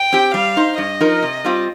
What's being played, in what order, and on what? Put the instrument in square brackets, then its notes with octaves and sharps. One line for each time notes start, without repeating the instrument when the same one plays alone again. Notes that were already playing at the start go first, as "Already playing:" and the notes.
Already playing: [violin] G5
[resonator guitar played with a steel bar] C4 G4
[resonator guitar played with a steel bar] G3 [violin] F5
[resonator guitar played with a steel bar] D#4 C5
[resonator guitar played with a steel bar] G2 [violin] D#5
[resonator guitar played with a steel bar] F3 D#4 A#4
C3
G3 C4 F4